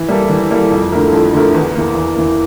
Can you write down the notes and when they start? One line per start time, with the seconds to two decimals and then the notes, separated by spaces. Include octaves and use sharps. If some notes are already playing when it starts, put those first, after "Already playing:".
Already playing: E3
0.08 G3 A#3 E4 A4
0.30 E3
0.50 G3 A#3 E4 A4
0.71 F2
0.92 D3 A3 E4 A#4
1.13 F2
1.33 D3 A3 E4 A#4
1.55 E2
1.75 E3 A#3
1.95 E2
2.16 E3 A#3